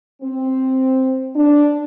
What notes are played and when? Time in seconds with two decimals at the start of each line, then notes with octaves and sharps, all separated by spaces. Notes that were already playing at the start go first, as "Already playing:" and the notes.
0.22 C4
1.35 D4